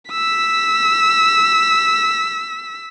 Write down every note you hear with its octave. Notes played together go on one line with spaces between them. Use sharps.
E6 B6